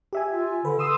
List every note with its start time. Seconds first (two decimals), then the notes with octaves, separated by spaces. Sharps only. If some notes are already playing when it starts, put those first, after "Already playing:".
0.13 G4 E5 G#5
0.32 F4
0.65 D3 B4
0.79 C6 D#6 E6